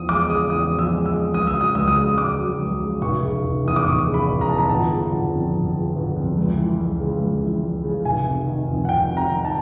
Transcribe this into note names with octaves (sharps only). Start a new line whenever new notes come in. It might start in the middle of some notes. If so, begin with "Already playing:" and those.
Already playing: E2 F3 D#6
G#3 D6
C#3 D#6
E2 D#6
F3
E6
G#3
E6
C#3
C#2 D#6
E6
F#3
D#6
C#2 E6
D#6
C#3
C#2 D6
F#3
C#2
C#3
F1 C#6
C#3
F1
E2 D#6
D6
F1 C#6
C#3
B5
F1
A#5
E2 A5
A#5
G1 A5
C#3
G1
F2
G1
C#3
G1
F2
C#2
E3
C#2
C#3
C#2
E3
C#2
C#3
F1 G#5
C3
D#3
F2
F#5
F1 G5
C3
A#5
D#3
A5